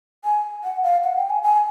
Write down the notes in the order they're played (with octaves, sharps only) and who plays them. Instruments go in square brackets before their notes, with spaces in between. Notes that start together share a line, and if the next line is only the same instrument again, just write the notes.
[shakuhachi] G#5
F#5
F5
F#5
G5
G#5
G#5